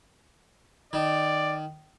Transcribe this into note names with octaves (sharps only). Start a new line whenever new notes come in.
D#3 D5